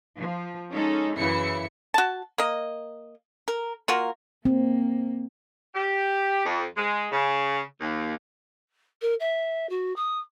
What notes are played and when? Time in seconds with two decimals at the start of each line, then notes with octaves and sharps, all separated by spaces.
0.17 F3
0.72 G#3 C#4 D#4 A4
1.18 F#2 C#3 E3 E4 C#7
1.94 F#4 A5
2.38 A#3 D#5
3.48 A#4
3.88 A#3 F4 F#4 A#4
4.45 A#3 C4
5.75 G4
6.45 F2
6.77 G#3
7.12 C#3
7.80 D#2
9.02 A#4
9.20 E5
9.70 F#4
9.96 D#6